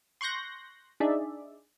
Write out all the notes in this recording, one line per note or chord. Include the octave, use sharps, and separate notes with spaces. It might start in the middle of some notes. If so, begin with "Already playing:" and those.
C6 C#6 F#6 G6 A#6
D4 D#4 G#4 D5 E5